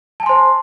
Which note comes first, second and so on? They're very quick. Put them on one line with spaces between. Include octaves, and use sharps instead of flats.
A5 G#5 C6 C5